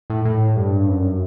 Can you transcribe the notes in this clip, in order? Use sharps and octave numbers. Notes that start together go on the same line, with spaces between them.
A2
A2
G2
F#2